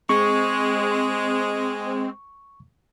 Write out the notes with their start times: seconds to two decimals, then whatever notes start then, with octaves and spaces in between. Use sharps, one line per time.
0.09 G#3 C4 C#6